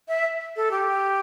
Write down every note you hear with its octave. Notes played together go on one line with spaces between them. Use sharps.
E5
A4
G4